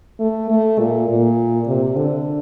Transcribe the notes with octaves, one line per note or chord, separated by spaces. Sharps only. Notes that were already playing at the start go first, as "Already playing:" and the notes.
A3
A3
A#2
A#2
C3
D3